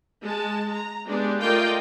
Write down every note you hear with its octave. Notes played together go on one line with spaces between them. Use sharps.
G#3 A5
A#5
G#3 B3 D4 G4 D5
A3 F4 A#4 D5 D#5 G5